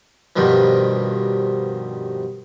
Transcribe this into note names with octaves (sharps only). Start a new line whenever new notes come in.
G2 B2 D#3 F3